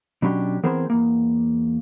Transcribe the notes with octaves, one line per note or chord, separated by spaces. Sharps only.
B2 F#3 C#4 D4 F#4 G4
E3 B3 C4 G#4 A#4 C5
E2 A#3